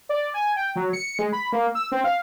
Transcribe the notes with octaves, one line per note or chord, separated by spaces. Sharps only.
D5
G#5
G5
F#3
C#7
G#3
B5
A#3
E6
C4
F5